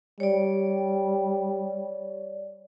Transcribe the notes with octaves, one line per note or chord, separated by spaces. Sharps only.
G3 C#5 D5